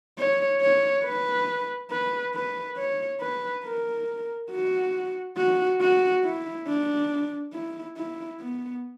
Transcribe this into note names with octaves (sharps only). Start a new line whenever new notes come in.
C#5
C#5
B4
B4
B4
C#5
B4
A#4
F#4
F#4
F#4
E4
D4
E4
E4
B3